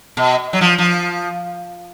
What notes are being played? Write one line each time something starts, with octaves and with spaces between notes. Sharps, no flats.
B2
F#3
F3
F3